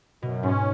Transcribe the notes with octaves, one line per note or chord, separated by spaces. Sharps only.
F#2 B2
G#2 C#4